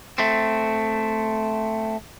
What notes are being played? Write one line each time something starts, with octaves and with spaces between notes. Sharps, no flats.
A3 C4